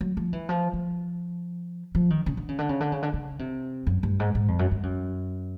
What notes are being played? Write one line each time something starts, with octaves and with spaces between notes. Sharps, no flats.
F#3
F3
E3
F3
F3
F3
D#3
C#3
D3
C#3
D3
C#3
D3
C#3
D3
C#3
C3
F#2
G2
G#2
G#2
F2
F#2
G2
F#2